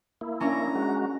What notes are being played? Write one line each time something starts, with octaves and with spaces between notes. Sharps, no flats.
A#3 E4
C#4 D4 C#5 A#5
G#3 F#4